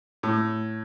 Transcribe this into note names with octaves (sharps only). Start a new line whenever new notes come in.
A2